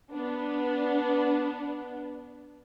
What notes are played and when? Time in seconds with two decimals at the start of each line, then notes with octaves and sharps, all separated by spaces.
0.10 B3 D4